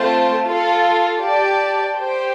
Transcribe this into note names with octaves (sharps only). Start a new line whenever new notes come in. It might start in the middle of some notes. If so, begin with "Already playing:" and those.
Already playing: A3 C4 F4 C5 A5
F4 A4 F5
G4 D5 A5
G4 C5 G5